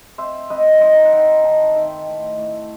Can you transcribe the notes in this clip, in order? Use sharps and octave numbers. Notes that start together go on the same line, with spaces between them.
C4 C5 E5
C4 B4 D#5
D#4 C5 E5
F#5
D#4 E5 G5
D#3 F#5 A5
D#3 E5 G5
A2
A2